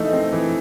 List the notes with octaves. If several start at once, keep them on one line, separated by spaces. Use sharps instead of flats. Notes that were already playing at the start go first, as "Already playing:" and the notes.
Already playing: E3 A3 D#4
C4
E3